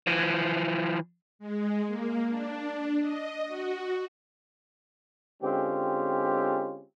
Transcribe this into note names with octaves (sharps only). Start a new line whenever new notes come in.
E3 F3
G#3
A#3
D4
D#5
F#4
D3 G#3 C4 C#4 F4 G4